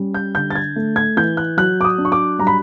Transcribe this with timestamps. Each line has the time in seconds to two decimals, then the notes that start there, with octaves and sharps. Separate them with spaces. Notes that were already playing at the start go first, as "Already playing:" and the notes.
Already playing: G3 C#4
0.14 G6
0.35 D3 G6
0.51 A6
0.55 G#6
0.76 A3
0.96 G#6
1.17 E3 G6
1.37 F#6
1.57 F#3 F#6
1.81 D6
1.84 D#6
1.98 D4
2.05 C#6
2.12 D6
2.39 G3 A#5
2.47 B5